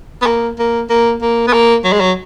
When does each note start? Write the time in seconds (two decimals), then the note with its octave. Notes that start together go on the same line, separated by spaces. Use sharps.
0.22 B3
0.26 A#3
0.59 A#3
0.90 A#3
1.22 A#3
1.47 B3
1.53 A#3
1.84 F#3
1.93 G#3
2.00 F#3